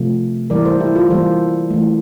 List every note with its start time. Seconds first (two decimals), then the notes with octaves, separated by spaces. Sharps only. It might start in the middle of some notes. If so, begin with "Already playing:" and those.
Already playing: C3 F3 A3
0.50 E3 G3 A#3 A#4 D5
0.65 A4 C5
0.80 E4 G4
0.96 F4 A4
1.10 E3 G3 A#3 A4 C5
1.71 E3 A3